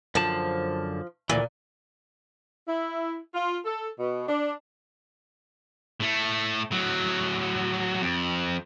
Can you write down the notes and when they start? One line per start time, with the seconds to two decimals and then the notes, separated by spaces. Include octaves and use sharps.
0.15 F#2 D3 F3 A5
1.29 D2 G2 A#2 E3
2.67 E4
3.34 F4
3.65 A4
3.99 B2
4.28 D4
6.00 A2 A3
6.71 A2 F#3
8.02 F2